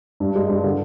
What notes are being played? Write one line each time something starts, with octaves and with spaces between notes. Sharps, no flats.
G2
G#3
G2
D3